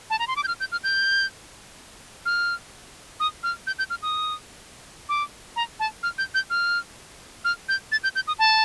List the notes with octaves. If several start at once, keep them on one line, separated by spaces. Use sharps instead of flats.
A5
A#5
C6
D6
G6
F6
G6
F6
G6
F6
D#6
F6
G6
G6
F6
D#6
D6
A#5
A5
F6
G6
G6
F6
F6
G6
A6
G6
G6
D#6
A5